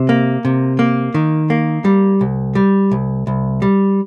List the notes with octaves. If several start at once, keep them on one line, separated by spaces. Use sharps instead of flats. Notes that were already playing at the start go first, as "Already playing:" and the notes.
Already playing: C3
A#3
C3
A#3
D#3
A#3
G3
C2
G3
C2
C2
G3